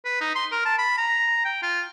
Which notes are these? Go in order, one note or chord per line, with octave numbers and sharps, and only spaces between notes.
B4
D#4
C6
A#4
A5
B5
A#5
G5
F4